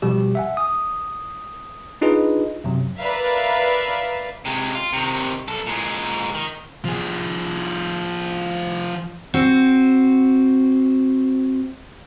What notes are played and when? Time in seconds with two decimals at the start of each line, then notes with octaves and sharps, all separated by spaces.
0.02 B2 F3 G3 G4
0.35 E5 F#5 G#5
0.57 D#6
2.01 D4 D#4 F4 G#4 B4 D#5
2.64 F#2 C3 F#3
2.99 A#4 B4 D5 E5 F5
4.45 C3 G#3
4.75 F4
4.93 C3 D#3
5.48 B1 A4
5.66 A#2 G#3
6.34 D#3
6.85 F3 G#4
9.34 C4 F#4